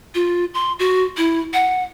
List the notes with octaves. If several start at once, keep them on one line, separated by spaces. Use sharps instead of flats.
F4
C6
F#4
E4
F#5